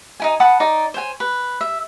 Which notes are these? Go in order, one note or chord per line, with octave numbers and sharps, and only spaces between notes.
D#4 E4 G#5
F#5 A5 B5 D#6
D#4 D5
C5 C#5 G5 G#5
B4
E5